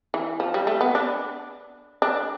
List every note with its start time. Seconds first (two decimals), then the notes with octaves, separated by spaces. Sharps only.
0.14 E3
0.40 F3
0.54 G3
0.67 A3
0.81 B3
0.95 D4
2.02 D4